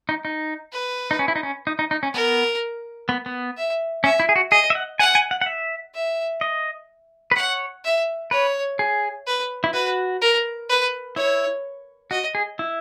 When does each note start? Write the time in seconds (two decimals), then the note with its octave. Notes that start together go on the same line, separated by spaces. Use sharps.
0.09 D#4
0.25 D#4
0.73 B4
1.11 D#4
1.19 C#4
1.28 E4
1.35 D#4
1.43 C#4
1.67 D#4
1.79 D#4
1.91 D#4
2.03 C#4
2.14 B3 A#4
3.09 B3
3.26 B3
3.57 E5
4.04 C#4 E5
4.20 E4
4.29 G#4
4.36 F#4
4.51 G#4 D#5
4.70 E5
4.75 F#5
4.99 F#5 G#5
5.15 G#5
5.31 F#5
5.41 F#5
5.46 E5
5.94 E5
6.41 D#5
7.31 B4
7.36 C#5 F#5
7.85 E5
8.31 B4 C#5
8.79 G#4
9.27 B4
9.64 E4
9.73 F#4 B4
10.22 A#4
10.69 B4
11.16 E4 C#5
12.11 F#4 D#5
12.35 G#4
12.59 E4